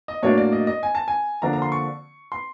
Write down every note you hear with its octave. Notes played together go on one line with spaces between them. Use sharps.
D#5
A2 F#3 A#3 D4 C#5
D5
D#5
D#5
G#5
A5
G#5
D3 F3 A#3 D4 A#5
A#5
C6
C#6
C6